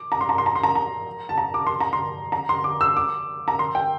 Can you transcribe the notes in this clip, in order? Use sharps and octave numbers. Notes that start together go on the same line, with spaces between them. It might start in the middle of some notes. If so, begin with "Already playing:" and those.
Already playing: D6
A#5
C6
A#5
C6
A#5
C6
A#5
A#5
A5
A#5
D6
C6
A#5
C6
A#5
C6
D6
E6
D6
A#5
C6
G5